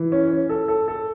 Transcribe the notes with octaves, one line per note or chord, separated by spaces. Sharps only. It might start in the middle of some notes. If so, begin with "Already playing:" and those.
Already playing: E3
C#4
C#4
A4
A4
A4